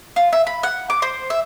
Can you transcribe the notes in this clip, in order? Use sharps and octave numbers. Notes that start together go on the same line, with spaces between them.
F4
E5
B5
F#5
D6
C5
E5